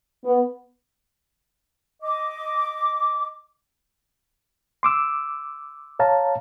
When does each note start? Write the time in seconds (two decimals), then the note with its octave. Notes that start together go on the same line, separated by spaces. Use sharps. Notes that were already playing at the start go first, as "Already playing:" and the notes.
0.24 B3
2.02 D#5 D6
4.83 C6 D6 E6
5.99 C#5 F5 A5 A#5